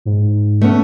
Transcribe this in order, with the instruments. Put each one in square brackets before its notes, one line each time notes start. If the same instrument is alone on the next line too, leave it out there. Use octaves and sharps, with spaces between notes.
[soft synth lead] G#2
[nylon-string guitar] A3 B3 C#4